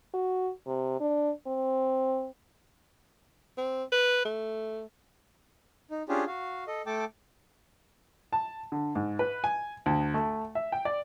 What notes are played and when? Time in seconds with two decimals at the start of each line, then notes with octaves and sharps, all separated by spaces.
0.14 F#4
0.67 C3
1.01 D4
1.47 C4
3.57 C4
3.92 B4
4.25 A3
5.91 D#4
6.09 C#4 D4 F4 G4 G#4
6.27 F#4 F5
6.67 A4 D#5
6.86 A3 A4 G5 A5 D6
8.33 A5
8.72 D3
8.95 G#2
9.19 B4
9.44 G#5
9.86 D2
10.14 A3
10.55 E5
10.72 G5
10.85 D5